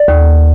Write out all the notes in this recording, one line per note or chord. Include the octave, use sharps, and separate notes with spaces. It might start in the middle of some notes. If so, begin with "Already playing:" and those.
Already playing: D5
D#2